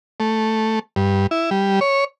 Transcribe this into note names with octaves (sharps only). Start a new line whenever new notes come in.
A3
G2
E4
G3
C#5